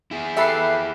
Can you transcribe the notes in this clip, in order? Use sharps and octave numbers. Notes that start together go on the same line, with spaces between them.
E4 G#4
G4 A4 B4 E5 B5 C7